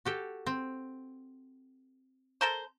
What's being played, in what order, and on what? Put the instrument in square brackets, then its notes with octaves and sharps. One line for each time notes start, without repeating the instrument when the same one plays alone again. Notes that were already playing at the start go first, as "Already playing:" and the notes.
[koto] F#4 G4 A4
C4
[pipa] A4 A#4 C5